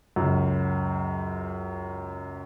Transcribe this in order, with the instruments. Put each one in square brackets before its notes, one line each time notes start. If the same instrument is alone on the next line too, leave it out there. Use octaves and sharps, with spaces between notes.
[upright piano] C#2 F#2